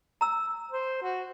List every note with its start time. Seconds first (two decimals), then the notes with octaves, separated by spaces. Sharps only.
0.21 A#5 E6
0.70 C5
1.03 F#4